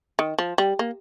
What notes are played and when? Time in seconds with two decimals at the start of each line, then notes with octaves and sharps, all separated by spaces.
0.19 D#3
0.39 F3
0.58 G3
0.79 A#3